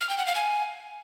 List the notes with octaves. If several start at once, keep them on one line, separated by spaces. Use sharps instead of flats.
F6
G5
F#5
F5
G#5